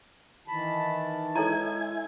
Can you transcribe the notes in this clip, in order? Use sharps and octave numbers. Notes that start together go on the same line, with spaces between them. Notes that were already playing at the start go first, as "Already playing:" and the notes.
D#3 E3 A5 B5
G#3 E4 A4 C#5 G#5 A#5